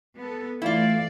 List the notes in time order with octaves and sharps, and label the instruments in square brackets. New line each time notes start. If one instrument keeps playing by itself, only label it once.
[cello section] B3 A4
[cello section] E3 D5 [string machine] A3 [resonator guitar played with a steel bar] E4 F4 [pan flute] F5